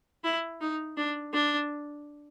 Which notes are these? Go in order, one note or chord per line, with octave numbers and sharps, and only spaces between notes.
E4
D#4
D4
D4